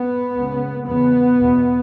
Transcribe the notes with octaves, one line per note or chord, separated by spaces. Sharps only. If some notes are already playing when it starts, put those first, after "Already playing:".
Already playing: B3
C#2 C#3
E2 C#3 B3
E2 B2